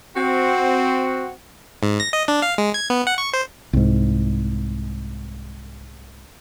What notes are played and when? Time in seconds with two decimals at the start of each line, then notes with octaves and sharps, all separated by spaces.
0.15 C4 F#4
1.83 G#2
2.00 A#6
2.13 D#5
2.28 D4
2.42 F5
2.58 G#3
2.74 G#6
2.90 B3
3.07 F#5
3.18 C#6
3.34 C5
3.73 C2 G#2